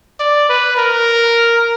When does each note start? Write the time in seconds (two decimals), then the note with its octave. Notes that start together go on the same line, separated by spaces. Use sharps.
0.20 D5
0.49 B4
0.77 A#4